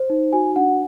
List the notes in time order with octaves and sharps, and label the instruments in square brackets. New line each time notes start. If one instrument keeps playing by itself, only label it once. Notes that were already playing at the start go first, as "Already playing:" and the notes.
Already playing: [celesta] C5
D#4
F#4 G#5
D4 F#5